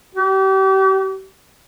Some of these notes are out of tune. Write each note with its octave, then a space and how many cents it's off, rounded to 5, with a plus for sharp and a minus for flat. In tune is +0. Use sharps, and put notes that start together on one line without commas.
G4 -35